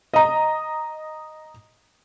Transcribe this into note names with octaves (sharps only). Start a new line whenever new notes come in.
D#5 A#5